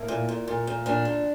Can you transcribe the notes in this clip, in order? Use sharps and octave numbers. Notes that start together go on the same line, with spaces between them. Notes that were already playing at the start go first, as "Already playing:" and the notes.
Already playing: A2 A#3
A#2
A#2
A#2
A#2
A#2 D4
A#2